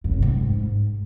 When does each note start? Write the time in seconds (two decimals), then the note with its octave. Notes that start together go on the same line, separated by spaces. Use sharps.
0.04 F#2
0.13 C3
0.22 G#2